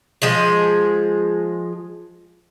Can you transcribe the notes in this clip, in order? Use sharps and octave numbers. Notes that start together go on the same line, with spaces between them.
F3 G#3 G#4